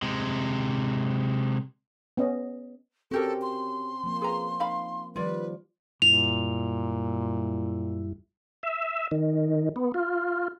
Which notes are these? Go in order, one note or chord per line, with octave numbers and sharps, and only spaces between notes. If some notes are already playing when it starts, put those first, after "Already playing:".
C3 G#3
B3 C#4 D#5
C4 C#4 F#4 G4 A4 A#4
C6
F3 A#3
G#4 B4 A#5
D#4 F5 B5
D#3 F3 G3 F4 B4 D5
F#2 A#2 G3 E4 F7
E5
D#3
B3
F4